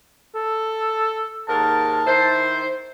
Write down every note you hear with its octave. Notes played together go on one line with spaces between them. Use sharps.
A4
D#2 G#2 A#4 A5
D#3 E4 C5